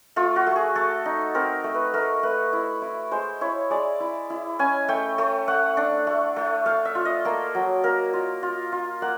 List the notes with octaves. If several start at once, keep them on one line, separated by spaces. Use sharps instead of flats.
A3 F4
F#4
A3
G#4
A3 A4
D#4
C4 A#4
A3
B4
A3 A#4
A3 B4
E4
E4
G#3 C5
E4 C#5
G#3 D5
E4
E4
C#4 G#5
A3 G5
A3
A3 F#5
D4
A3
A3
A3 F5
E5
F4
D#5
A#3 A4
F#3
A#3 A#4
F4
F4
F4
A#3 F#5